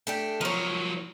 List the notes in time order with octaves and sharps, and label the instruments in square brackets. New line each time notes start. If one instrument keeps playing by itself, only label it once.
[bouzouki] A3 D4 G4
[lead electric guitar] F3 F#3 [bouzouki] A#4 C#5